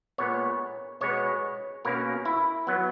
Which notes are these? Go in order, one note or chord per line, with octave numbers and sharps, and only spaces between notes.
A#2 G#3 B3 C#5
B2 G#3 B3 C#5
B2 A#3 C#4 A#4
E4
F#3 B3